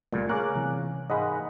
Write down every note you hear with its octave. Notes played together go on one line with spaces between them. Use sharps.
C#2 A#2 G3 A3
A#3 C#4 G#4 A#4 D6 F#6
C3 E3
G#2 G#3 A#3 D#5 F#5 B5